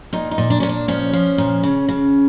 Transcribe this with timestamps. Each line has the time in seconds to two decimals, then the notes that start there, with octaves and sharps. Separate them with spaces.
0.13 A#2 D#4
0.31 D#4
0.38 A#2
0.50 D4
0.60 A#2 C#4
0.69 D4
0.88 F3 C#4
1.13 F3
1.38 A#2
1.63 C#3
1.88 C#3